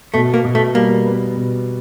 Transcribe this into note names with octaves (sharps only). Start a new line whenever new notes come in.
B2 A3
A#3
B2
A3
G3 A#3
B3
B2